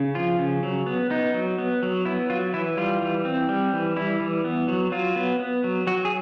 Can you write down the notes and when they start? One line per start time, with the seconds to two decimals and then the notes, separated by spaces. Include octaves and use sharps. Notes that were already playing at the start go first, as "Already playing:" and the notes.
Already playing: C#3
0.15 F3 F4
0.39 C#3
0.63 F#3
0.87 B3
1.10 B3 D#4
1.34 F#3
1.58 B3
1.83 F#3
2.05 B3 E4
2.30 F#3 F4
2.54 E3 E4
2.77 G3 F4
3.01 E3
3.25 C4
3.49 G3
3.73 E3
3.96 G3 E4
4.20 E3
4.45 B3
4.68 F#3
4.92 F#3 F4
5.16 B3
5.39 B3
5.64 F#3
5.87 F#3 F#4
6.05 G#4